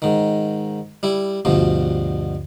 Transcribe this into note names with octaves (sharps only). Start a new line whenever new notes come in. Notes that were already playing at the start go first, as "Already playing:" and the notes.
G#2 D#3
G3 E4
D2 G2 B2 F3